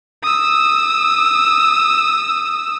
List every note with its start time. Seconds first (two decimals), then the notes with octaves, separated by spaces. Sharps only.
0.23 D#6 E6